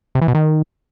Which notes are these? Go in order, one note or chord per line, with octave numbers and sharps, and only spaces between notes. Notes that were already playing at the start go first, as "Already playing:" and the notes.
C3
E3
B2
D#3